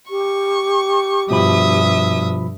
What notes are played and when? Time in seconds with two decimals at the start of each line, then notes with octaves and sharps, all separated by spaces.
0.10 G4 C#6
1.30 G2 B2 F3 E5 B5 D#6